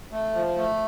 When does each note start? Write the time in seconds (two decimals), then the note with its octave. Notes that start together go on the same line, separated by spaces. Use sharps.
0.11 A3
0.34 F3
0.56 A3